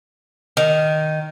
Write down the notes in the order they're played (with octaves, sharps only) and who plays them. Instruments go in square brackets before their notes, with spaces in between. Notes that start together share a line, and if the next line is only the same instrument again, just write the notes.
[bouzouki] D#3